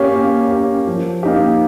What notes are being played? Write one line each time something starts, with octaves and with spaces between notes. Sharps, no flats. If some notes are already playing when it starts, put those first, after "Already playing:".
Already playing: A#3 C#4 G4
A#3
C#4 G4
F3
A#3 D#4 G4